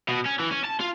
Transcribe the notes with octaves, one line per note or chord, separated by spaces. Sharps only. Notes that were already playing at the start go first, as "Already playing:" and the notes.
B2
C#4
E3
C#4
A5
F4